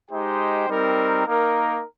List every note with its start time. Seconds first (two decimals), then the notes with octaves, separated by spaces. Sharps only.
0.10 G#3 D#4 G4 C5 G5
0.68 G3 C4 D#4 A#4
1.26 A#3 D#4 A#4